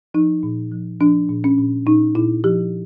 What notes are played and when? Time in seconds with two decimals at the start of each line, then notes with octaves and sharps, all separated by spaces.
0.14 F3 D#4
0.43 A#2
0.72 F3
1.00 F3 D4
1.29 A#2
1.44 C#4
1.58 A#2
1.86 A#2 D#4
2.15 A#2 E4
2.44 F3 G4